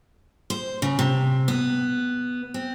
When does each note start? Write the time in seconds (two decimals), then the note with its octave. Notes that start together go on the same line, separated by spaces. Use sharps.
0.50 C5
0.82 C#3
0.99 C3
1.48 B3
2.54 C4